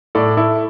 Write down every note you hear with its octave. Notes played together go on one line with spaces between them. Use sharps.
A2 A4 D5
E4 A4